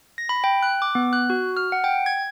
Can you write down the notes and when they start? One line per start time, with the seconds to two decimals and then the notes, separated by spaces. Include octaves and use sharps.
0.18 A#6
0.29 B5
0.44 G5
0.63 F#6
0.82 D6
0.95 B3
1.13 F#6
1.30 F#4
1.57 F6
1.72 F#5
1.84 G5
2.06 G#6